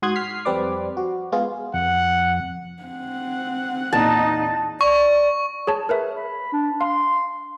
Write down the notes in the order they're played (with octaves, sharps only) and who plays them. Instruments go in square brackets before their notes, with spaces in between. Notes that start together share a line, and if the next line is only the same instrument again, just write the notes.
[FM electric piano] G#2 F#4 C6 D#6 F#6 G#6
F6 B6 C7
F2 G3 C4 B4 D5 D6
F#4
G#3 B3 F4 G#4
[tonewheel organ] F2 [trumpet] F#5
[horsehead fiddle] C4 F#5
[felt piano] E2 A#2 E3 [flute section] D#4 [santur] A5
[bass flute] D5 [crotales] C#6
[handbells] G#4 C#5 A5
A#4 B4 E5
[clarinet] B5
D4
[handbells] F5 [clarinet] C6